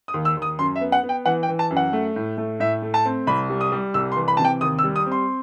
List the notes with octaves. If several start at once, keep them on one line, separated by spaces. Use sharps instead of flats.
D#6
D#2
E6
D#2
D#6
F#2 C6
E5
B3
F#5
B3
G5
E3 F#5
G5
E3
A5
F#2
F#5
A3
A2
A3
A2 E5
A3
A5
C4
C2 B5
G3
D#6
G3
C2 E6
C6
E3
B5
C3 A5
G5
D#2 D#6
E6
G3
D#6
C4
C6